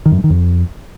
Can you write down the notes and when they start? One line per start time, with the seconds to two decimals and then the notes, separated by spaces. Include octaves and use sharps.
0.06 D#3
0.12 F#2
0.18 G2
0.24 D#3
0.30 F2